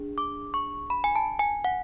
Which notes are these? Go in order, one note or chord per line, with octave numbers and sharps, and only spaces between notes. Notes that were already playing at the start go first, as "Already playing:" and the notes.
Already playing: D4 G#4
D6
C#6
B5
G#5
A5
G#5
F#5